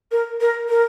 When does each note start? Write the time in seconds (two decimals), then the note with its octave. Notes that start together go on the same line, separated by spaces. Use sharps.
0.12 A#4
0.41 A#4
0.69 A#4